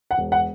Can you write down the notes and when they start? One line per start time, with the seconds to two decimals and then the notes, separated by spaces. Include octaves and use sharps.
0.11 F#5
0.18 E1
0.32 F#5